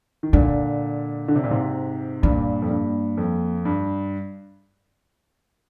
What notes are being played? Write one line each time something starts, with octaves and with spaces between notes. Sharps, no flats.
D#3
A#2 D3 G#3
D3
C3
A#2
G#2 C3
G2 A#2 A#3
F2
G2
F2
G2